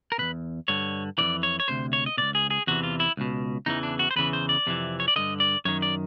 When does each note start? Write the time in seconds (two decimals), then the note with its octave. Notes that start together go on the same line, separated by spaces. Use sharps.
0.12 A#4
0.18 E2 B2 B4
0.68 G2 D3 C#5
1.18 F2 C#3 E3 D5
1.43 C#5
1.60 C#5
1.68 D2 C3 C5
1.93 C#5
2.06 D#5
2.17 C#2 B2 D5
2.35 G#4
2.50 G#4
2.67 E2 C3 E3 F#4
2.83 F4
3.00 E4
3.17 C#2 B2
3.66 E2 C#3 E3 D#4
3.83 D4
3.99 F#4
4.11 C5
4.16 E2 C#3 E3 B4
4.33 C5
4.49 D5
4.67 F2 C3 E3
5.00 C#5
5.08 D5
5.16 G2 D3 D#5
5.40 D5
5.65 F#2 D#3 C#5
5.82 D5